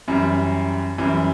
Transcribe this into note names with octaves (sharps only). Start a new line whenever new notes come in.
F#2 E3 G3
F#2 E3 G3